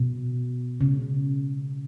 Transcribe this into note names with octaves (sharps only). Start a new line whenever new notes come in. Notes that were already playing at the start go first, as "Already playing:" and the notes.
Already playing: B2
C#3